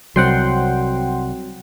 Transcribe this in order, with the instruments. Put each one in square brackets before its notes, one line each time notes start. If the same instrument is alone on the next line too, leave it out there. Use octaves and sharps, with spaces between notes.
[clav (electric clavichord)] C2 [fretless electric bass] F#3 C4 [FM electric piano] F#5 G5 C6